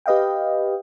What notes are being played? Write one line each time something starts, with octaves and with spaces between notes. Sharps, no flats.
G4 B4 D#5 F5 G5